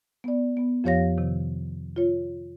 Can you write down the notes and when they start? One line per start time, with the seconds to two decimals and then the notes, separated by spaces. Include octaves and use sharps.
0.24 B3 D5
0.57 B3
0.84 F2 F3 G4 C#5 F5 A#6
1.18 C3 D#3
1.96 F4 C#5